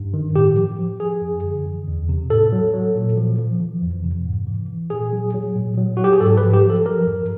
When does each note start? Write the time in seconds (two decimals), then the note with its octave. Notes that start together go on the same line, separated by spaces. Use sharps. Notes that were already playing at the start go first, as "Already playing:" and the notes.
Already playing: G2
0.14 D#3
0.36 A2 G4
0.57 F3
0.78 F3
1.00 F3 G#4
1.22 F#2
1.44 D3
1.66 E3
1.88 E2
2.09 C3
2.30 A2 A4
2.52 F#3
2.74 F#3
2.95 A#2
3.17 F3
3.39 F3
3.60 E3
3.82 F2
4.04 C3
4.26 G#2
4.47 E3
4.69 E3
4.90 A#2 G#4
5.12 F#3
5.34 F#3
5.56 A#2
5.77 F#3
5.97 F#3 F#4
6.04 G4
6.13 G#4
6.21 G#2 A4
6.37 B4
6.42 F3
6.53 G4
6.64 F3
6.70 A4
6.86 F#3 A#4
7.07 G2